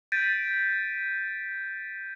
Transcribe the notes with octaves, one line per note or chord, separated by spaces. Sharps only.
G6 A6 B6 D7 D#7